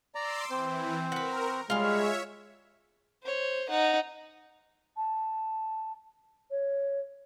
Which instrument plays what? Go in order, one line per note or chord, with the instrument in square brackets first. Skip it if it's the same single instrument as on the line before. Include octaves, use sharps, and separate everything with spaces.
[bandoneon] D5 A#5 [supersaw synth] C6 D6 E6
[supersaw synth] E3 [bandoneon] C4 C5
[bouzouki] F#4 B4 [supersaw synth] A#4
[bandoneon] G3 [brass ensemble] G#3 [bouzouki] F4 F5 [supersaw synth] C#5 E5
[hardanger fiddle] C5 C#5
D#4 F#5
[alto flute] A5
C#5